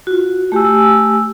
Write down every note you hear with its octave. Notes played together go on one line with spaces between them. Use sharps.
F4 F#4
A3 G4 G#5 E6